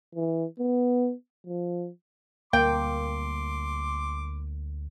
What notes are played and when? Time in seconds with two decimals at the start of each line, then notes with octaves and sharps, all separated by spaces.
0.15 E3
0.59 B3
1.46 F3
2.53 D2 G3 A#3 G5 C6 D6